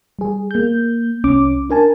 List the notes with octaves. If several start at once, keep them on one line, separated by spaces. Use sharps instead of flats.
G3 G#4
A#3 G6
C2 C#4 D6
D4 A#4 G#5 A5